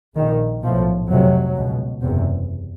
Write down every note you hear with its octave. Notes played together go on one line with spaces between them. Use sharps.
A#1 A#2 D#3
B1 A2 F3
F1 F2 C3 F#3
C#2 B2
F#1 E2 C3